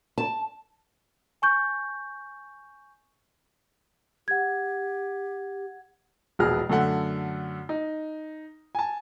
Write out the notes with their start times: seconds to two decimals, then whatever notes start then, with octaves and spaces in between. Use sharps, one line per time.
0.18 A5
1.42 G#5 C#6 G6
4.28 G4 F#5 G#6
6.39 E1 A#1 B2 G#4 F6
6.70 F#2 D3 A3 F#5
7.69 D#4
8.75 G#5 A5